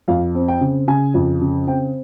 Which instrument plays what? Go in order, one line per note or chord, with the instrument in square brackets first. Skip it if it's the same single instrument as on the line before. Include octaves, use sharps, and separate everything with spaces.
[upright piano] F2 F5
C4
G5
C#3
C#3 G#5
F2
C#3
C4 G5